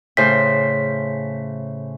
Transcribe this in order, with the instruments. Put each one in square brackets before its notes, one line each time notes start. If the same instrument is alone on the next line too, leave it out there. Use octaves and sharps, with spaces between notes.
[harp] A2 C#3 C5 [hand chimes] B6